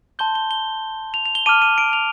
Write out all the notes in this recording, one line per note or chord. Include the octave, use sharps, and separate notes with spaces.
A5 C6 G6 G7
G7
G7
F7
F7
G7
A5 D6 F6 D#7
D#7
D7
F7